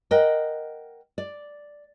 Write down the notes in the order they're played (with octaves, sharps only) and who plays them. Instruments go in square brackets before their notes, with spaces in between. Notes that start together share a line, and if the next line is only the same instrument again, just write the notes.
[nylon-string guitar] A#4 D#5 F#5 G5
D5